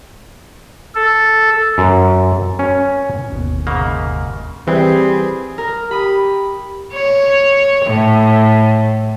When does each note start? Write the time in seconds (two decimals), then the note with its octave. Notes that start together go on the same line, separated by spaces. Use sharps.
0.95 A4
1.78 F#2
2.59 C#4
3.32 G1 D#2 B2
3.67 G#2 C#3 A#3
4.67 E3 G3 C4 G#4 G#5 B5
5.58 A#4
5.91 G4 B5 D#6
6.94 C#5
7.85 A2